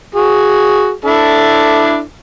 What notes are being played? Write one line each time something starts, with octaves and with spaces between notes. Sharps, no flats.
F#4 G#4
D4 E4 A4